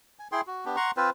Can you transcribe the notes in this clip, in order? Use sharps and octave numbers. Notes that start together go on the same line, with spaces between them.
G#5
E4 G#4 G5 C6
F#4
B3 D4 G4
F#5 A#5 C6 C#6
C4 F4 B4 C5